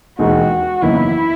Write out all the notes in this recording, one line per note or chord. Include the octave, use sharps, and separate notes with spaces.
E1 D#2 D#3 G#3 F#4
F#1 E2 D#3 A#3 E4